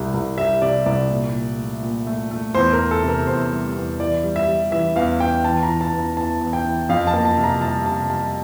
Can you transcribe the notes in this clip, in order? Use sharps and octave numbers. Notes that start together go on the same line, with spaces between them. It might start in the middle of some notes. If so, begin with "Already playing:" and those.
Already playing: C2 G3
C2
G3 E5
C3 D5
C2 D5
A#2
A#2
A3
A#2
A3
A3
E2 C5
A#4
E2
A4
C3
A#4
E2 C5
G3
E2
E3 D5
G3
E5
G3
E3 E5
E2 F5
E2 G5
E3 A5
A#5
E3
A5
E2
A#5
E2 A5
E2
G5
E3
F2 F5
A5
A#3
A5
C3
A#5
G3 A5
C3 A5
G3 A5